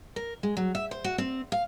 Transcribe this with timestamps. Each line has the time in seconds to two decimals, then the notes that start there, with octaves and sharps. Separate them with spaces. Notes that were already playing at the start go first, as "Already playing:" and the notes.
0.16 A#4
0.43 G#3
0.57 F#3
0.75 E5
0.91 C5
1.04 F#4
1.18 C4
1.52 F5